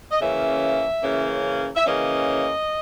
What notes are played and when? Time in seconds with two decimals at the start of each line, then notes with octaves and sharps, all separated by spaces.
0.12 D#5
0.20 C#3 E3 A#3 C#4 E5
1.03 C#3 E3 A#3 C#4
1.76 E5
1.85 C#3 E3 A#3 C#4 D#5